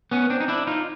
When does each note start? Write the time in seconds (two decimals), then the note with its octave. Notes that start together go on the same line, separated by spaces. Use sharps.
0.11 B3 C#4
0.30 C4 D4
0.40 D#4
0.48 D4 E4
0.67 D#4 F4